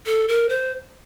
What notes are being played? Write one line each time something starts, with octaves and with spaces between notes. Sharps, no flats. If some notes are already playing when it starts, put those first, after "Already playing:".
A4
A#4
C5